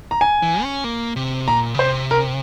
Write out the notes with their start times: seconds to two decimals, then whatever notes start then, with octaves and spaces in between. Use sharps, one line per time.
0.11 A#5
0.21 G#5
0.42 E3
0.63 C#4
0.84 A#3
1.16 C3
1.48 A#2 A#5
1.74 C#3
1.79 C3 C5
2.11 A#4